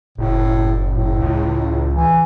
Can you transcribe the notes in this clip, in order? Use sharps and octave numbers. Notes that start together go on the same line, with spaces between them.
F#1 A2
A2
C#2
E3